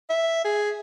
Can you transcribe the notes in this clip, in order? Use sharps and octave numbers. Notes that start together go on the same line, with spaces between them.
E5
G#4